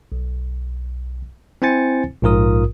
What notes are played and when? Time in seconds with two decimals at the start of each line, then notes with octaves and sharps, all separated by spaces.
0.12 B1
1.62 C4 E4 C5 G#5 A6 C#7
2.22 A#1 G#2 F4 A#4 D#6